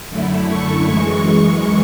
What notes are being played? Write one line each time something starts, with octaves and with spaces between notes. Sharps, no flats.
F#2 D3 A3 E4
C#6
F#2 E3 G#3 C#6
C#6